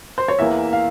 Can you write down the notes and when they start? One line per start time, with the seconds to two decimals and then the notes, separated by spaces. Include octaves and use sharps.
0.18 C5
0.28 C#5
0.39 E2 E3 A#3 E5
0.73 F5